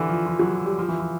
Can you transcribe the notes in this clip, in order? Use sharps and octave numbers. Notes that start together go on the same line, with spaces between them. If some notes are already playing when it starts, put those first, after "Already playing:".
Already playing: D3 E3
F3
F3
F#3
G3
F3
E3
F3